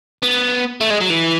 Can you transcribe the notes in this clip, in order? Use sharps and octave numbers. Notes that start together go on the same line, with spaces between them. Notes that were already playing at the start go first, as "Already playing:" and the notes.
B3
A3
G#3
F#3
E3